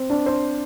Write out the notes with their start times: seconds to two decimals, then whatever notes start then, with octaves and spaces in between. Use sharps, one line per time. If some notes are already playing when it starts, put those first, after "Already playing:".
Already playing: C4
0.10 D4
0.26 C5